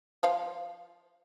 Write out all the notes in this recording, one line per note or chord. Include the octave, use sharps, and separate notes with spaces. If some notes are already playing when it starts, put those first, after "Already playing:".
F3 C5 F5